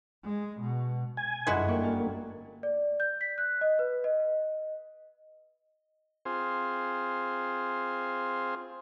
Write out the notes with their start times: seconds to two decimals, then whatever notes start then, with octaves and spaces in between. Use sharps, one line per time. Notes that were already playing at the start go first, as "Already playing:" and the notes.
0.24 G#3
0.60 B2
1.17 G#5
1.47 G1 F#2 G#3 E4 F#4
1.69 A#3 D5 G5 C#6
1.83 A5 F6
2.63 D5
3.00 G6
3.21 B6
3.38 F#6
3.61 D#5
3.79 B4
4.04 D#5
6.25 C4 F4 G#4 C5